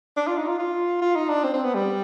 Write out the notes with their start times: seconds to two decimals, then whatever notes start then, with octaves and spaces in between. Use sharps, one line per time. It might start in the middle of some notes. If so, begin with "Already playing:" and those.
0.17 D4
0.27 F4
0.37 D#4
0.48 F4
0.59 F4
1.02 F4
1.15 D#4
1.29 D4
1.44 C4
1.54 C4
1.64 B3
1.75 G3